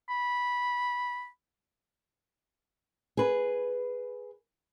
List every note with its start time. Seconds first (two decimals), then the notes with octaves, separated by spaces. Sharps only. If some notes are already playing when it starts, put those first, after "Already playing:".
0.09 B5
3.17 G#4 B4